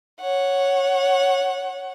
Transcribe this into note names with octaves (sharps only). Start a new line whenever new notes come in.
C#5 F#5